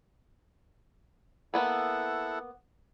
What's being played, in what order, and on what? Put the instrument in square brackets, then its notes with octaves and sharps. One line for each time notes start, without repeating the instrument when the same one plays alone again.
[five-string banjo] A#3 B3 B4 [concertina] E4 A4 F#5